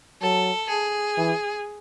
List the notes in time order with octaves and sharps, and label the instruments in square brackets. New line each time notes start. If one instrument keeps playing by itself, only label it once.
[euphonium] F#3 [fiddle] A4
[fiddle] G#4
[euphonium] E3